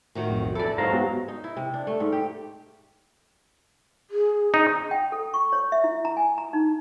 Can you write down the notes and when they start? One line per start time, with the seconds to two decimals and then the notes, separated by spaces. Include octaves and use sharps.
0.15 A2 D#3 F#4
0.29 B1 F2
0.55 E2 E4 A4 D5
0.78 G#2 F#3 C5 F5 A#5
0.93 B3 F#4 G4
1.28 D#4
1.44 E4
1.57 C3
1.74 D4
1.87 A3
2.00 G#2
2.12 G4
4.11 G#4
4.54 D#4
4.91 G5
5.12 A4
5.34 C#6
5.53 C#5
5.72 E5
5.84 E4
6.05 A#5
6.17 G#5
6.38 A#5
6.53 D#4